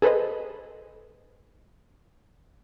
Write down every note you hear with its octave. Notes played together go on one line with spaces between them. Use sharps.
G#4 A4 B4 C5 D#5